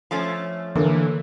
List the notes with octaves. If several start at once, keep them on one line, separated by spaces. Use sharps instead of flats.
F3 A3 C#4
D3 E3 A#3 A4